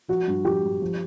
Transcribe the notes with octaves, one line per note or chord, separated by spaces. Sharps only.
F3 F#4
G2
F3 G4
G2
F3